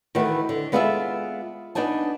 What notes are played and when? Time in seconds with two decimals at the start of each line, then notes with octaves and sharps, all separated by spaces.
0.15 D#3 E3 A3 F#4 B4
0.49 D3
0.72 G#3 B3 F4 G#4 D5 E5
1.75 B3 D4 D#4 G#5 A5